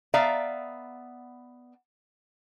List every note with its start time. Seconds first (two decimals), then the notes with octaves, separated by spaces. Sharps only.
0.14 B3 D5 E5 F5 A#5